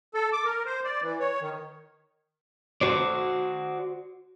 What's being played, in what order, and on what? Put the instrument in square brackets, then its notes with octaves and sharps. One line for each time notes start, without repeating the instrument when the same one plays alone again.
[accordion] A4
D6
A#4
C5
D5
E3
C#5
D#3
[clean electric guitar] F#4 C5 D5